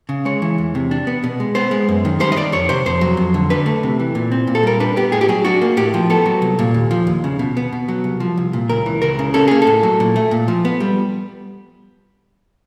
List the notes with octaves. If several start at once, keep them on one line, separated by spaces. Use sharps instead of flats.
C#3
G#3 C#5
E3
E2
C3
D4
B3
B2
G#3
B3 C5
G#3
F#2
D#3
G3 C5
D#5
D#3 D5
F2 C#5
C3 C5
F2 C5
F#3
F2
D3
D4 B4
A3
C3
E3
A#2
C4
A#2
A4
G3 A#4
D4 B4
B3 G4
A2 G#4
G4
F#3 G#4
D4 F#4
A#3
A2 G4
F3
B3 A4
F#3
C2
A#2
D#2
F3
D#2
C#3
B2
B3
B2
F#3
C2
F3
C2
A#2
C#2 A#4
E3
C#2 A#4
C#3
C#4 A4
A#3 G#4
A4
A2
F#3
A#2
A3
A#2
F3
B3
G3